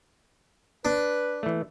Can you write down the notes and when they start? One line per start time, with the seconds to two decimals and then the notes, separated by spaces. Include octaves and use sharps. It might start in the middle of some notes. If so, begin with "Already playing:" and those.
0.85 D4 B4
1.43 E3 A3